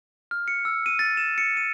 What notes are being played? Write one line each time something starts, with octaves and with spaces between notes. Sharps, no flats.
F6
C#7
E6
D#7
A6
E7
C#7
D#7